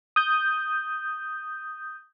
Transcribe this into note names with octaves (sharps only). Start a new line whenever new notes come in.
D#6 G6